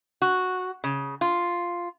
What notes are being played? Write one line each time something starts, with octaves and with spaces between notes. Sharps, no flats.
F#4
C#3
F4